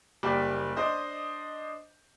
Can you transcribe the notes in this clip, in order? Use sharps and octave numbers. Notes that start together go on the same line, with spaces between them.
F#1 G3 A#3 D5 G5
D4 C5 D#5